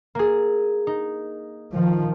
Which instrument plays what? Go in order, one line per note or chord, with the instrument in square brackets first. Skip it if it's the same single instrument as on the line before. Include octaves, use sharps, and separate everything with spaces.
[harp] A#3 G#4
D#4
[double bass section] D#3 F3